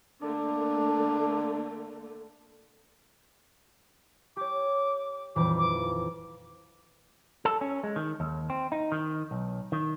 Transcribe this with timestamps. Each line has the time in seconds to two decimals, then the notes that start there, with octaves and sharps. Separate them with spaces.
0.22 D3 A3 A#3 D4
4.36 G4 C#5 D6
5.36 D#1 F2 E3 D6
5.58 D6
7.45 A4
7.61 C#4
7.84 G#3
7.96 D#3
8.20 D#2
8.50 C4
8.72 D#4
8.92 D#3
9.31 B1
9.72 D#3